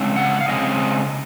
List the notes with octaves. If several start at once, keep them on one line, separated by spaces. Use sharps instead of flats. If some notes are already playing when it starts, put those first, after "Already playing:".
Already playing: C#3 G#3 C4
F#5
F5
C#3 G#3 C4 D#5